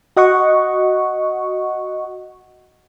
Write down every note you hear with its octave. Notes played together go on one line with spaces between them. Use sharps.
F#4 D#5 F#5 C#6